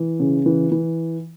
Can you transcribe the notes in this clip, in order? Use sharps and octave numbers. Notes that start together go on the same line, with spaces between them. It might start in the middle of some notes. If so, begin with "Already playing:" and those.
Already playing: E3
C#3
E3
E3